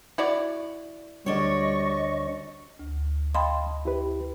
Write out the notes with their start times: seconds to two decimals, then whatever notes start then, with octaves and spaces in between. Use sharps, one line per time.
0.18 E4 F#4 D5
1.26 D2 G3 D4 C#5 D#5 C#6
2.79 D2
3.35 D#5 F5 G5 A5 B5 C6
3.85 E4 G4 B4